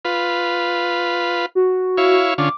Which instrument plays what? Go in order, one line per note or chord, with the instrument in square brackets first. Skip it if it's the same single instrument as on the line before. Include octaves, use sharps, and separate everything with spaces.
[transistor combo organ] F4 B4
[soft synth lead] F#4
[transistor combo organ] E4 C#5 F5
[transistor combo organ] D3 C#4 F4 [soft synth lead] D6